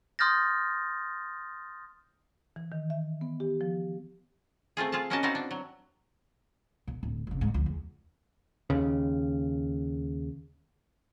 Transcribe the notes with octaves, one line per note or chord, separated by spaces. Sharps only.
C6 D#6 F6 G6 A6 A#6
E3
D#3
E5
B3
G4
F3
A3 C4 F4 G#4
F4 G#4 F5 A5
A#3 C#4 F#4 A#4 D#5 A5
B3 C4 D#4 E4 F#4 F5
D4
F#3
B2
D1
F#1 C3
G#2
D2 F3
E2
D#2 C#3